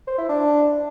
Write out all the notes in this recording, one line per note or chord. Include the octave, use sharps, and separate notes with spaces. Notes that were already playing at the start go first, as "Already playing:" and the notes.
C5
E4
D4